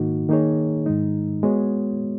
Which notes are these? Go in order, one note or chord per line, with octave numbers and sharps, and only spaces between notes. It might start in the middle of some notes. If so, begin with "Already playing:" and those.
Already playing: G#2 D#3 A#3 D#4 F#4
D#3 A#3 D#4 G#4 C#5
G#2 D#3 G#3 D#4
G#3 B3 F#4 C#5